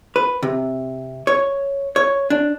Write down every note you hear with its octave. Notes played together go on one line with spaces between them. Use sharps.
B4
C3
C#5
C#5
D4